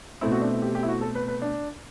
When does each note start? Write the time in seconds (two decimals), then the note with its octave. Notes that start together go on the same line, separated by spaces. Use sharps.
0.21 B2 A3 C4 E4
0.32 F#4
0.41 D4
0.52 E4
0.62 G4
0.75 G4
0.83 E4
0.88 F#4
1.01 A4
1.15 B4
1.28 B4
1.42 D4